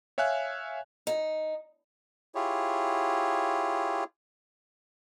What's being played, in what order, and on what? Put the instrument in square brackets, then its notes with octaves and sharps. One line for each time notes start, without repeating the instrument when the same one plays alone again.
[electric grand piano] C#5 E5 F5 G#5 F#6
[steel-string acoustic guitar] D#4
[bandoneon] E4 F4 G4 G#4 C#5